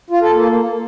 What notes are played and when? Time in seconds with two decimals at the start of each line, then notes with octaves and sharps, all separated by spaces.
0.10 F4
0.21 A4
0.32 A#3